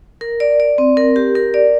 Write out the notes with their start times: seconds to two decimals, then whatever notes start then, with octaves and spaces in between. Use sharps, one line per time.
0.21 A#4
0.40 D5
0.60 D5
0.78 C4
0.97 A#4
1.16 G4
1.35 A#4
1.54 D5